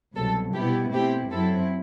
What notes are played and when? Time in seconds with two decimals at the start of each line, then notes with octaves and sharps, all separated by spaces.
0.15 C2 B2 F#3 A4
0.54 B2 G3 B3 E4 G4
0.93 B2 A3 C4 E4 G4
1.31 F#2 F#3 C4 E4 A4